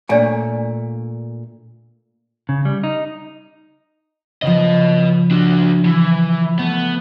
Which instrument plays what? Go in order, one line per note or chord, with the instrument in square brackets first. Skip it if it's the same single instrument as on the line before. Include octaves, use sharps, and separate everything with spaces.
[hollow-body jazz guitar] A#2 A3 C#5 [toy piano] D4 D5 G#5
[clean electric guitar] C#3
G3
D#4
[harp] C#3 F3 [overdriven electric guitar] B4 D#5
[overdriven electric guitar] D4 F#4
E3
[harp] A3 [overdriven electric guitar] B3